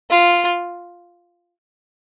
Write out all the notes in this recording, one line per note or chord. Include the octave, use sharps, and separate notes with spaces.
F4